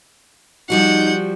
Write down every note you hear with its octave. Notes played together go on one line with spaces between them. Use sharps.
F3 G3 D#4 F#4 F#5 G6